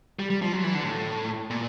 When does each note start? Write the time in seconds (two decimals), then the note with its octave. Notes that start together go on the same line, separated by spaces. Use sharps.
0.19 G3
0.30 G3
0.42 F3
0.52 F#3
0.63 E3
0.74 D3
0.84 A2
1.50 A#2